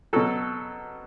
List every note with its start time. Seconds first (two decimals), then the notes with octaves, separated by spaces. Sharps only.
0.13 B2 F#3 A4